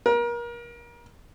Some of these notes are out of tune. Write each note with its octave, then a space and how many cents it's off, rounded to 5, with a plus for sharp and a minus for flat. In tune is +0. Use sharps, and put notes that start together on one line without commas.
A#4 +30